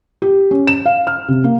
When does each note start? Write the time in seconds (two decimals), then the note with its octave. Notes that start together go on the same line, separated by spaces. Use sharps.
0.22 G4
0.51 C#4
0.67 E7
0.86 F5
1.07 F6
1.28 C3
1.44 A#3